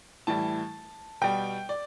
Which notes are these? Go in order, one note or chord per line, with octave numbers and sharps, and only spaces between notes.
A2 E3 G3 A5
B2 G3 G5
D5